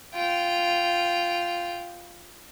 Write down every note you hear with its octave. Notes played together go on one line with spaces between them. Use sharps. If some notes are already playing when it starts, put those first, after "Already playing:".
F4 G5